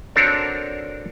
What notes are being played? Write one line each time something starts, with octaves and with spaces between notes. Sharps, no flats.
C4 D4 F#4 A4 A#4 C#5